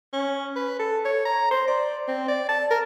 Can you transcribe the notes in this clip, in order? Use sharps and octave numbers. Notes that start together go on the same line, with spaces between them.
C#4
B4
A4
C#5
A#5
C5
D5
C4
D5
A5
A#4